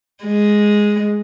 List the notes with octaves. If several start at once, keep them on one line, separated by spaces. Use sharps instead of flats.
G#3